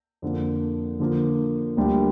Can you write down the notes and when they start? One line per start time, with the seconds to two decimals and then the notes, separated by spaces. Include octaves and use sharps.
0.22 F2 D3 F3 A#3
0.99 D3 F3 A#3
1.77 D2 D3 G3 A#3